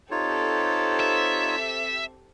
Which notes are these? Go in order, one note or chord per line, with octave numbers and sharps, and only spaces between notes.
C4 D#4 F4 G4 A4 C#5
E5